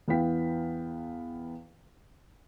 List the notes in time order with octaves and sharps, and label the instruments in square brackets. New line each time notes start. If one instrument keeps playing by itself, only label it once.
[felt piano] E2 B3 E4 F5 G5 B6